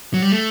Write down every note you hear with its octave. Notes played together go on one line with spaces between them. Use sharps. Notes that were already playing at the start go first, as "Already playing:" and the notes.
F#3
G3
A3